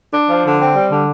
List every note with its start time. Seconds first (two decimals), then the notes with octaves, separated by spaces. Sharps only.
0.14 D4
0.29 F3
0.45 D3
0.61 C4
0.75 G3
0.91 D3